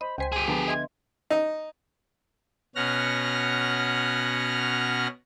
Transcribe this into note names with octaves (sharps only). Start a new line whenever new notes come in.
C5 D#5 B5
C#2 C5 G5 G#5 C6 B6
G4 G#4 D#7
D3 F3 B3 A5 B5
D#5 E5 C6 G#6
D#4
B2 C#4 F#5 F6 A#6